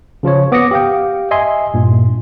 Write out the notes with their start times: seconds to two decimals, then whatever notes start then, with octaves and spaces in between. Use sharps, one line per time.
0.23 C#3 F3 F4 C#5
0.52 B3 D6 D#6 A#6 C#7
0.71 G4 F5 G5
1.31 D#5 E5 G#5 C6
1.74 G2 A#2